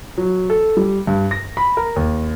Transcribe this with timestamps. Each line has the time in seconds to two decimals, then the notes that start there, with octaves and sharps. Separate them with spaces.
0.18 F#3
0.50 A4
0.77 G3
1.07 G2
1.31 A#6
1.57 B5
1.77 A#4
1.96 D#2